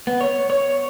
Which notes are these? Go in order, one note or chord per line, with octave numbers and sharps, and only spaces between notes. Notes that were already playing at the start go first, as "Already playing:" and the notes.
B3
C#5
C#5